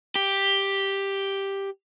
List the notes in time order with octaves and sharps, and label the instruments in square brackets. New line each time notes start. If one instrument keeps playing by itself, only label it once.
[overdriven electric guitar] G4